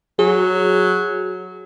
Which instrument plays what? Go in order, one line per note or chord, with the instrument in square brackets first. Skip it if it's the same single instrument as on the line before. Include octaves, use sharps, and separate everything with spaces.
[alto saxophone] F#3 [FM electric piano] G#4